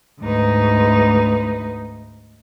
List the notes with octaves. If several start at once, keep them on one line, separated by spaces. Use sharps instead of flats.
D2 G#2 D#4 B4